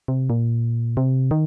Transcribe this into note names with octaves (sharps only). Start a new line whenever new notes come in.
C3
A#2
C3
D#3